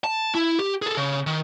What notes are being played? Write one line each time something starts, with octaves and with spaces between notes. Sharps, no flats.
A5
E4
G4
G#4 A4
C#3
D#3